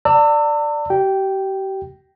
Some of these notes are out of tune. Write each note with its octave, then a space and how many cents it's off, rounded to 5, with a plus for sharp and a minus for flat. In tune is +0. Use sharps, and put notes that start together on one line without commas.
D5 +0 A5 +45 E6 +0
G4 -35 G5 -5